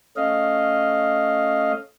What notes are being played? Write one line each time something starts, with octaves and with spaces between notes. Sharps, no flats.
A3 C#4 D#5 F5